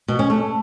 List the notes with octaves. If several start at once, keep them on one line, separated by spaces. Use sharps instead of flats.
B2
C#4
A3